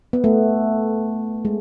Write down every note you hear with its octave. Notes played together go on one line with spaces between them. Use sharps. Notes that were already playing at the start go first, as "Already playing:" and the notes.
B3
A3
G#3